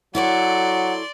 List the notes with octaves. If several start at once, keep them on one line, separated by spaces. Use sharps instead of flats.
F#3 E4 A4 C#5 D5 F#5 C6